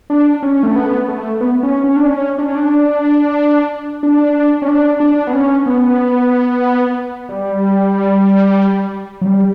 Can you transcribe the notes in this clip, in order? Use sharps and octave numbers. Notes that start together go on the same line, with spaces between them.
D4
C#4
A3
B3
A3
B3
C#4
C#4
D4
C#4
D4
C#4
D4
D4
C#4
D4
D4
B3
C#4
B3
G3
F#3
G3